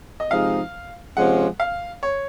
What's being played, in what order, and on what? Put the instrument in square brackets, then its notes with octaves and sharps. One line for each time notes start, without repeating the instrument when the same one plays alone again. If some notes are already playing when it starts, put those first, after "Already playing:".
[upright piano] D#5
[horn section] C3 F3 G#3 D#4 [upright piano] F5
[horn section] C3 F3 G#3 C#4 [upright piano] F#5
[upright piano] F5
C#5